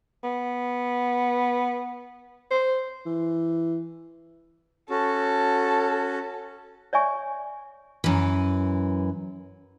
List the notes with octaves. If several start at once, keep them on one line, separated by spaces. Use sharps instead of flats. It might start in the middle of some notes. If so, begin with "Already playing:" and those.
B3
C5
E3
C#4 F#4 A4
C#5 D5 E5 G#5 C#6
F#2 E3